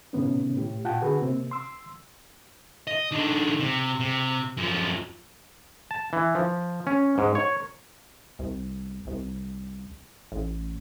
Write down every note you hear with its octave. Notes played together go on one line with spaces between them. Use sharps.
A2 C3 D#3 B3 C#4
A2 G4
A#2 F4 F#5 G5 A5
D3 F#4 G#4 A4 B4
C3 A#3 C4
C6 E6
D#5
D#3 D4
C3
C3
F#2 F3
A5
E3
F3
C#4
G#2
C#5
C2
C2
A1